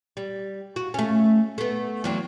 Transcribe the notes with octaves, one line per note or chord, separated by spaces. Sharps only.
G3
F#4
A3 C#4
A3 B3
E2 F#3 C4